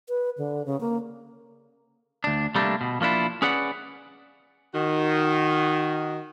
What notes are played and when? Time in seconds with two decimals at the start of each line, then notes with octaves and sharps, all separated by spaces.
0.09 B4
0.38 D3
0.66 C#3
0.80 A#3
2.24 D2 D4
2.55 C3 G3 A3 A#3 C4 D4
2.81 B2
3.01 F3 A#3 D4 E4 F4
3.42 C#4 G#4 B4 D5 F#5
4.74 D#3 F#4